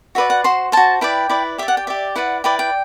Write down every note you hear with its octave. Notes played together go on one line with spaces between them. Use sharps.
F#4 B4 D5 E5
F#5
F#4 C5 C6
F#4 C5 A5
E4 B4 D5 G5
E4 B4 D5
G4 D5 E5
F#5
G5
G4 D5 E5
E4 B4 D5 F#5
E4 B4 D5 G5
G5